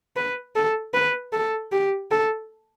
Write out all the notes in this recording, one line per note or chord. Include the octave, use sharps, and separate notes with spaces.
B4
A4
B4
A4
G4
A4